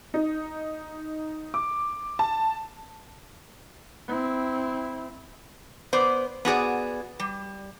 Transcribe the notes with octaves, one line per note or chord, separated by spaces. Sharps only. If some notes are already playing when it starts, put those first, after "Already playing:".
D#4
D6
A5
C4 E4
B3 C5 D5
B3 F#4 G#4 D5
G3